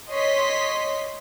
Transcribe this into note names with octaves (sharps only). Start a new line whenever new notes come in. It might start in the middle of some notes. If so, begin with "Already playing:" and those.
C#5 D#5 C6 B6